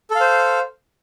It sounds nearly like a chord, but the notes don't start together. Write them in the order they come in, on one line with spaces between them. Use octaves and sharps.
A4 F5 C5